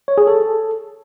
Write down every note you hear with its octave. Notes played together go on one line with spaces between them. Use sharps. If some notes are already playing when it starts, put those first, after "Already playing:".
C#5
G#4
A4